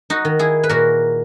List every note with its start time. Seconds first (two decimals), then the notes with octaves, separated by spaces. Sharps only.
0.10 D#4 F#4
0.25 D#3
0.39 E4 G#4
0.63 B4
0.69 A#2 F#4 A#4